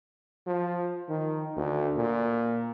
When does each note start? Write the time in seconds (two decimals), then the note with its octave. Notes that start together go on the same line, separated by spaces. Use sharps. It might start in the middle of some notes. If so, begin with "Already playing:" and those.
0.47 F3
1.09 D#3
1.57 D2
1.97 A#2